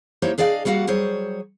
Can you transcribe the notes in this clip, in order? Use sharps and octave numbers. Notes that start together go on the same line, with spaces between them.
A#3 D#4 E4 G4 C5 C#5
D4 G#4 D5 D#5 F5
G3 A#3 F#4 F5 F#5
F#3 G3 G#4 C5 C#5